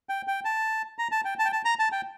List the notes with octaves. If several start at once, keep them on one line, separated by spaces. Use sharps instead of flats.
G5
G5
A5
A#5
A5
G5
A5
G5
A5
A#5
A5
G5